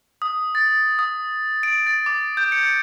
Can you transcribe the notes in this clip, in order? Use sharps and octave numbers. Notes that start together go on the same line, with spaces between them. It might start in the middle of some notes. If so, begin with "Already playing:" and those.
D#6
A6
D#6
D7
A6
D6
G6
C#7